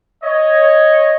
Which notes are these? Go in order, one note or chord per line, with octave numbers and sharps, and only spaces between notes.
C#5 D#5